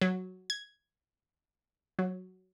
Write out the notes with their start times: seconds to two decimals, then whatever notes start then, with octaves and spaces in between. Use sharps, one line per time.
0.02 F#3
0.50 G#6
1.99 F#3